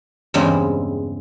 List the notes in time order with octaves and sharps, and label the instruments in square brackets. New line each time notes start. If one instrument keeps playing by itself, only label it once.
[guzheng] E2 G2 C#3 G#3 C4